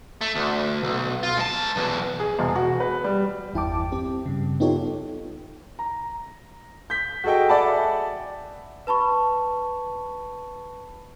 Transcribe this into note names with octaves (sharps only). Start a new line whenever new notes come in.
A3
D2
B1
F4
G#3 A5
B1 E2
G#4
E1
F#4
B4
G3
G1 E2 E4 G5 A5 D6
C4 G4
G2 C#3
B3 D#4 F4 G4 A4 C#5
A#5
G6 B6
F#4 G#4 A4 D#5 G5
D5 E5 F#5 G#5 A5 B5
B4 A5 B5 C#6